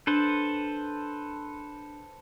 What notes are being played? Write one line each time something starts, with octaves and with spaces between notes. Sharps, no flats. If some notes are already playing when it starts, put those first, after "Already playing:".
D4 A4 B4 C5